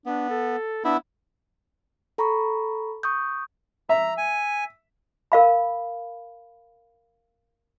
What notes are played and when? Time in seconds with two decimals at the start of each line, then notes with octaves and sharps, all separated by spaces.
0.06 B3 D4
0.30 A4
0.85 B3 D4 E4
2.18 A4 A#5 B5 C#6
3.03 C#6 D#6 G6
3.89 E5 A#5
4.17 G#5
5.32 A#4 F5 B5